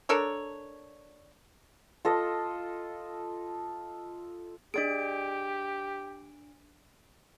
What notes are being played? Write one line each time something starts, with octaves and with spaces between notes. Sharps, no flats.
D4 A4 A#4 C#5
F4 A4 D#5
D4 G4 G#4 D5 D#5 D7